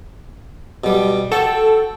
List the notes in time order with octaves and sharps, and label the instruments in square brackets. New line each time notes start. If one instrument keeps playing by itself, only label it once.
[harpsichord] B2 G3
[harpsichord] F#4 G5 [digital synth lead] A4